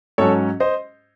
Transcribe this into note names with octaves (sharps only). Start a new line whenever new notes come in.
G#2 F#3 C#4 A4 C#5
C5 D#5